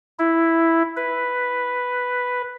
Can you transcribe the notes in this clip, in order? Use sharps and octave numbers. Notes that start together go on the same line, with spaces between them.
E4
B4